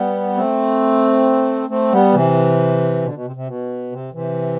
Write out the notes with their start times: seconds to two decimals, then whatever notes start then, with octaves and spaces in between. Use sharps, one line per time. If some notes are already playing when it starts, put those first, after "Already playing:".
Already playing: G3 B3
0.36 A3 C4
1.69 A3 C4
1.92 G3 B3
2.14 C3 E3
3.02 B2 D3
3.14 B2
3.25 C3
3.36 C3
3.47 B2
3.92 C3
4.13 C3 E3